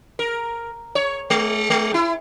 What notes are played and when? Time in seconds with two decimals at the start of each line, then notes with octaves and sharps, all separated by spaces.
0.19 A#4
0.95 C#5
1.30 G#3
1.70 G#3
1.94 E4